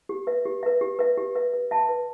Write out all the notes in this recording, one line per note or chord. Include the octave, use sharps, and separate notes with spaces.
G4
B4 E5
G4
B4 E5
G4
B4 E5
G4
B4 E5
B4
E5 A5
B4